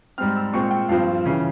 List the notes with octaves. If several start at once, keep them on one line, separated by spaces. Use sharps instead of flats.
G#2 G3 C4 F6
E6
A#2 G#3 C4 C#6
G5
G2 F3 C4 F5
C#3 E3